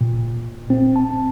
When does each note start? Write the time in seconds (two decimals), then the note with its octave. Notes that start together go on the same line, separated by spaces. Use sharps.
0.01 A#2
0.70 C4
0.96 A5